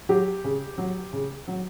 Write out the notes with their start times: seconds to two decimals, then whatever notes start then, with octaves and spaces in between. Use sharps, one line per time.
0.09 F#3 G4
0.44 C#3
0.78 F#3
1.13 C#3
1.48 F#3